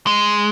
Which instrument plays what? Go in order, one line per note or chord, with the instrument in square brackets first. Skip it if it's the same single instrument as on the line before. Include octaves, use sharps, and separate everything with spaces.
[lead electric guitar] G#3